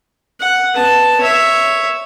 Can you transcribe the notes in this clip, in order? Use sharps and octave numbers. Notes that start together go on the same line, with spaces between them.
F#5
B3 A5
C#5 E5